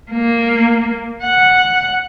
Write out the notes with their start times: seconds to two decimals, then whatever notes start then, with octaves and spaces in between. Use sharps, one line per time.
0.12 A#3
1.23 F#5